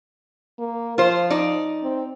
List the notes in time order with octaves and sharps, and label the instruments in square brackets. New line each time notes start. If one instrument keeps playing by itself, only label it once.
[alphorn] A#3
[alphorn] F3 [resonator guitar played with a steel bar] F4 C5
[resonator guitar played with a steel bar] D#4 D5
[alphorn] C4